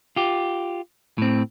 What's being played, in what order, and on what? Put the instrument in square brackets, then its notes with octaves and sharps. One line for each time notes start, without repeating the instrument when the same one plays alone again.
[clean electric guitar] F4 G4
A2 C4